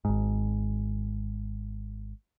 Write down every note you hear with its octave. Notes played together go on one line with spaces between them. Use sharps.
G#1 G#2